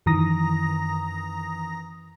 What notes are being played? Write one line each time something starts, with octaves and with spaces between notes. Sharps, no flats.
F#2 D#3 E3 A#5 D#6 A#6